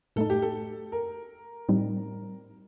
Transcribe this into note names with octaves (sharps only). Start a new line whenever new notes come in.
A2 A3 D#4 A4
G4
A4
A#4
A2 G3 C4 D#4